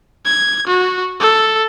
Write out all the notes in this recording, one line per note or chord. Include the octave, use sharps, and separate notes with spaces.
G#6
F#4
A4